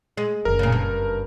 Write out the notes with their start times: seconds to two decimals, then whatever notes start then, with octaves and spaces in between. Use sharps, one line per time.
0.17 G#3
0.45 F#1 D3 A#4
0.59 A#2 C#3
0.72 G2